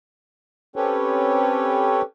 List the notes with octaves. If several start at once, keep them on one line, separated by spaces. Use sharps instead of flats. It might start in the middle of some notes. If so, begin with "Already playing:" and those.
C4 C#4 G4 A4 B4 C#5